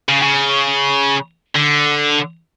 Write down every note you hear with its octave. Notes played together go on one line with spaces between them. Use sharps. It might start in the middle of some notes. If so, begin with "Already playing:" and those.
C#3
C#3
D3